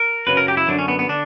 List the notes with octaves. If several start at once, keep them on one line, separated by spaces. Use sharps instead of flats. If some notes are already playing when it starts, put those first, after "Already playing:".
Already playing: A#4
F#2 C#3 F#3 B4
A#4
G4
E4
F#2 D3 F#3 D4
C#4
B3
B3
D3 D4